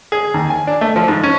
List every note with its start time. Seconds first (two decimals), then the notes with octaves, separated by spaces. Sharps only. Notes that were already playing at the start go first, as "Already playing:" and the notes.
0.12 G#4
0.34 D#2
0.50 G#5
0.67 D4
0.81 A3
0.96 F3
1.08 G#2
1.23 C#4